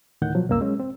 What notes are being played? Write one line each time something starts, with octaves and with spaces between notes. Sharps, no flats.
D2 A2 D#3 F#5 G6
B2 F3 F#3
C2 F#2 A#3 E6
G#3 C#4
C4